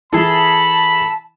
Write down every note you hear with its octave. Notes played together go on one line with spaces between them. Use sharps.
E3 E4 G#4 A4 A5 B5